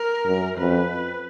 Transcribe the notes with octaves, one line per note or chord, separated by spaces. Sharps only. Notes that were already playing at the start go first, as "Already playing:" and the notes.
Already playing: A#4
F#2
F2 B4